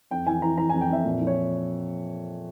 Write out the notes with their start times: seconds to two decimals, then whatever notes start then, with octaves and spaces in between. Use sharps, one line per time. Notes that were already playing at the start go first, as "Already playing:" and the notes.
0.11 F2 G5
0.26 E3 G#5
0.42 E3 A#5
0.57 E3 A#5
0.69 F2 G#5
0.81 G5
0.90 F2 E5
1.04 A#2
1.21 F3
1.27 C#5